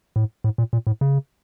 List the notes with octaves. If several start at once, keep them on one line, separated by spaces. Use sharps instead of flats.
A2
A2
A#2
A#2
A2
C#3